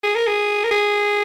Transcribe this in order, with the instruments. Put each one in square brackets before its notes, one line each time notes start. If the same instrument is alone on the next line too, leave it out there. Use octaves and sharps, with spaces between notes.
[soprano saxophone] G#4
A#4
G#4
A#4
G#4